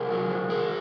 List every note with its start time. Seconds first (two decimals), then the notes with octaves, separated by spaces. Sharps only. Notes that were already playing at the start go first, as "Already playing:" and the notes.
Already playing: C3 G#4 A#4
0.11 F#3
0.30 C3
0.50 D#3 G#4 A#4